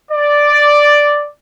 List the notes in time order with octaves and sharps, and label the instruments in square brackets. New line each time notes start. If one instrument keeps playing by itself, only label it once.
[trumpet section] D5